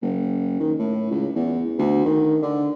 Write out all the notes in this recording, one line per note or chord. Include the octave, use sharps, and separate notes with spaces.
F#1
D#3
A2
C#2
E2
D2
D#3
D3